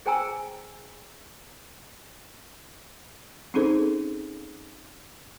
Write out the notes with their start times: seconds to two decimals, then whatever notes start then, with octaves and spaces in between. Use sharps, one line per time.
0.06 G#4 C5 G5 G#5 A#5 E6
3.54 C4 C#4 D#4 G#4 A4 C5